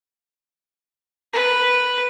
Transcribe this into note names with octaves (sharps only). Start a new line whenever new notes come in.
B4